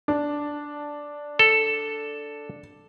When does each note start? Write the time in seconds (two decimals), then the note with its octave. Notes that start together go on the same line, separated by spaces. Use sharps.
0.08 D4
1.39 A4